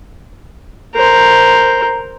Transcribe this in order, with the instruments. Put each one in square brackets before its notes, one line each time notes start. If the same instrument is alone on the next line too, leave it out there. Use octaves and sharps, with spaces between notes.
[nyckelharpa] A#4 C5